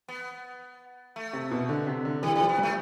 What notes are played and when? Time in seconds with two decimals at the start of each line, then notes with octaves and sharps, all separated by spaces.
0.08 B3
1.16 A3
1.33 C3
1.51 B2
1.69 D3
1.87 C3
2.05 D3
2.23 E3 G3
2.36 G3
2.41 F3
2.49 B3
2.58 G3 A3